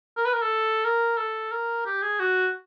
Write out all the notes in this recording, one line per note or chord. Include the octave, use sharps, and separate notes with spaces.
A#4
B4
A#4
A4
A#4
A4
A#4
G4
G#4
F#4